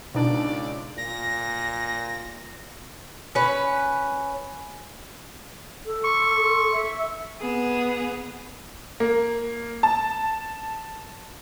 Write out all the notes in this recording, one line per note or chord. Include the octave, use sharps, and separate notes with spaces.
C#2 B2 D4 D#4 D5
A#2 A#6
C#4 B4
A4
C#6
E5
B3 G#4
A#3
A5